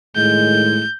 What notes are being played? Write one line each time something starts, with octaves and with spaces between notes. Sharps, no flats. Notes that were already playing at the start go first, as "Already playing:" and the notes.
A2 D#3 G#3 G6